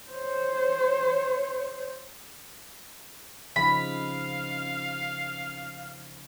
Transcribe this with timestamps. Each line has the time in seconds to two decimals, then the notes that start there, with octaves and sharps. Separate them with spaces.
0.10 C5 C#5
3.56 C#3 F3 D#4 F5 B5